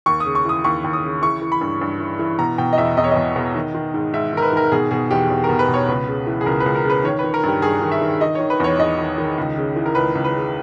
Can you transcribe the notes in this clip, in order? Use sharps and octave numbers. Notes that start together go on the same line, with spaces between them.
D#2 C#6
D#6
C#3
C#6
E3 D#6
D#2 C#6
D#2
D#6
C#3
E3 C#6
E3
B5
G2
G2
E3
E3
B2 A#5
B2 G5
D#5
E2 E5
E2 D#5
C#5
B2 D#5
B2
D#3
D#3
G#2
G#2 E5
D#3 A#4
B4
D#3 A#4
B2 G#4
B2 G#4
E2 G4
E2
A#4
B2
B4
B2
C#5
C#2 B4
C#3
E3
G#4
C#2 A#4
B4
C#2
A#4
C#3 B4
D#3 C#5
B4
D#3
A#4
G2 G4
G2 G#4
D#3
E5
D#3
D#3 D#5
D#3 C#5
B4
E2 C#5
E2 D#5
D#3
D#3
C#2
C#3
E3
A#4
C#2 B4
C#2
B4
C#3